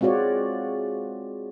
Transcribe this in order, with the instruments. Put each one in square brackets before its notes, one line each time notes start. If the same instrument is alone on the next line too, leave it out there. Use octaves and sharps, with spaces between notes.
[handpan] G#3 C4 F4 F#4 C#5 D5